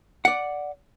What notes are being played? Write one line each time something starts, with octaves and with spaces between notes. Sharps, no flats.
D5 F#5